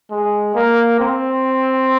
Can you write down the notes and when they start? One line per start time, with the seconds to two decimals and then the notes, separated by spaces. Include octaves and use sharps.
0.11 G#3
0.55 A#3
1.00 C4